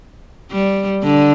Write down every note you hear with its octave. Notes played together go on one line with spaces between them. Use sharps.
G3
D3